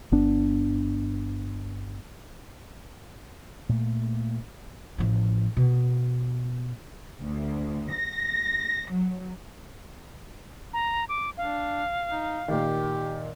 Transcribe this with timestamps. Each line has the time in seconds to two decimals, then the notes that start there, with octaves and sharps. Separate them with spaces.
0.12 G1 B3 D4
3.69 A#2 A3
4.98 A1 F3
5.57 B2
7.22 D2
7.92 A#6
8.90 F#3
10.73 A#5
11.09 D6
11.37 D4 F5
12.12 D#4
12.48 A#2 D#3 G4